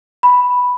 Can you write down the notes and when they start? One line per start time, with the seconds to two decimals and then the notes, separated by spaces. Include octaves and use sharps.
0.23 B5